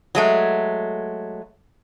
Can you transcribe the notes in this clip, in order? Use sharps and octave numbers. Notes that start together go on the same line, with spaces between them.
F#3 G#3 A3